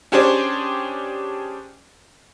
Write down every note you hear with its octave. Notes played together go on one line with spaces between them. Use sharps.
C#4 D4 G4 G#4 C5 D5